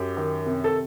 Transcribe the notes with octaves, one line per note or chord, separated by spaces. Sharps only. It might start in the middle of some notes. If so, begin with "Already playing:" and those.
Already playing: F#2 G4
D#3
C3
A4